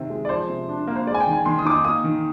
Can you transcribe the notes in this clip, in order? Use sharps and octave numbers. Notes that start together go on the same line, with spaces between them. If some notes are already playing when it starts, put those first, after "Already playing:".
Already playing: C3 D#3 C4
G#3
D5
F3 C5
C3
D4
A#3
C5
G#3 D5
G#5
G5
D#3
G#5
D#3 C6
D#6
D#4 D6
D#6
A#3 D#6
D#3